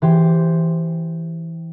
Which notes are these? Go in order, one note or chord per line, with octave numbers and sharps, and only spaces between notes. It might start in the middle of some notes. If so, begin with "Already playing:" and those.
E3 G4 C5 G5